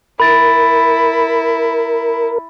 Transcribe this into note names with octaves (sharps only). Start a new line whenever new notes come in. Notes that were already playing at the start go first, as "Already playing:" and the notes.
E4 A#4 B5 A6 D7